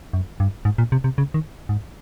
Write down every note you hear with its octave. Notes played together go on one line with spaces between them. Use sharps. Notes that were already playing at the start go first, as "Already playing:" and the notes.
F#2
G2
G#2
A#2
C3
C3
C#3
D#3
G#2